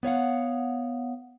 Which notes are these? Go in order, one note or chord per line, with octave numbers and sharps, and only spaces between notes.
B3 C#5 F5 F#5